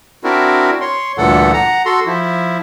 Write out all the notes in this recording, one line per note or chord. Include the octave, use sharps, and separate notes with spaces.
C4 D4 E4 F#4 A#4
C#5 C6
D2 G2 A#2 E3 A4 F#5
F#5 A#5
F#4 A4 C6
F3 E4